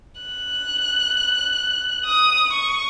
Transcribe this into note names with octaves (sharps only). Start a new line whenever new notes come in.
F#6
D#6
C#6